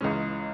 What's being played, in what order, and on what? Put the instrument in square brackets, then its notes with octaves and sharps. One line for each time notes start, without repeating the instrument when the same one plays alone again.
[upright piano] C#2 C#3 E3 G#3 C#4